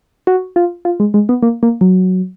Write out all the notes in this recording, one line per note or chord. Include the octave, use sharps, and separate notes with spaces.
F#4
F4
F4
G#3
G#3
B3
A#3
A#3
F#3